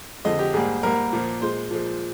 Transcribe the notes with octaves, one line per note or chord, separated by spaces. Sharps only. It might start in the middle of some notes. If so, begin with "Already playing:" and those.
F2 D3 G#3 D#5
G4
G#2 G3 A#3 G#4
G#2 G3 A#3 A#4
A#2 F3 A#3
A#2 G#3 C5
A#2 F3 G#3